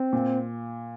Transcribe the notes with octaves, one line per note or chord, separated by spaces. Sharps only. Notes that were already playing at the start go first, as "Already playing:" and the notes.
Already playing: C4
A#2